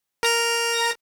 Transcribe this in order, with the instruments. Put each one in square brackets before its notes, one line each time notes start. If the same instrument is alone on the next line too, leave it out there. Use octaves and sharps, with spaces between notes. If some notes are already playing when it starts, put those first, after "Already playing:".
[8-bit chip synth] A#4 A#5 A#6